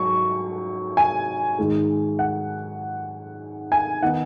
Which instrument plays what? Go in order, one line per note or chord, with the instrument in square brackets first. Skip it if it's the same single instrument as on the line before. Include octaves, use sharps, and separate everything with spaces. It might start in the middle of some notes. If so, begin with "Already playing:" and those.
Already playing: [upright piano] G#2 F#3 C#6
G#5
G#2 D#3 G#3
F#5
G#5
D#3 B3 D#4 F#5